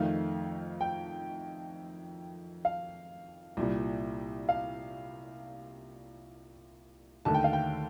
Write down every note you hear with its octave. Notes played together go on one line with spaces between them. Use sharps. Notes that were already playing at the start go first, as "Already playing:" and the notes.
Already playing: F2 D#3 A3 F5
G5
F5
C2 A#2 G3
F5
D#2 D3 A3 A5
G5
F5
G5